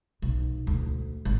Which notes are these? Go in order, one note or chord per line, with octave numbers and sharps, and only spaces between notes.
B1
D2
G#1